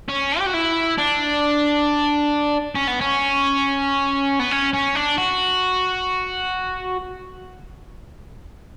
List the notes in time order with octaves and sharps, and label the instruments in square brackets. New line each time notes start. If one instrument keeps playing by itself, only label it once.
[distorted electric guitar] C#4
G4
F#4
E4
D4
C#4
B3
C#4
B3
C#4
C#4
D4
F#4